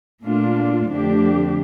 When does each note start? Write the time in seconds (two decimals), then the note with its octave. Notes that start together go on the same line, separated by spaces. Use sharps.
0.24 A#2 A3 D4 F4
0.89 F2 D3 A3 D4 G4